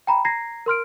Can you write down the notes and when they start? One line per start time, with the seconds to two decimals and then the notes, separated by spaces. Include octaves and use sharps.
0.07 G5 A#5 B5
0.25 A#5 G#6 A#6 C7
0.66 A#4 C6 F6 D7